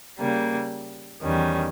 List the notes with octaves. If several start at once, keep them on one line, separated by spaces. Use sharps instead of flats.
C#3 G3 A#3
E2 D#3 G3 C#4